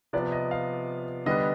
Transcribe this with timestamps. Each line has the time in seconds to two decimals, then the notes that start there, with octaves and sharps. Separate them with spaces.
0.13 C3 F3 B3 D5
0.32 D#5
0.51 F5
1.26 D3 G3 B3 D4 D#5